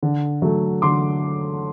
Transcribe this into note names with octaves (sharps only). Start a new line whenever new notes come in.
D3
F#3 A3
D3 C6 D6